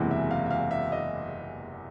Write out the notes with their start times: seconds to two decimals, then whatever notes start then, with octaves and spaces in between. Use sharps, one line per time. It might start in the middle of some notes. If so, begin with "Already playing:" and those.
Already playing: F#1 E2 C3 E3 G#3
0.11 E5
0.31 F5
0.46 E5
0.51 F5
0.71 E5
0.92 D#5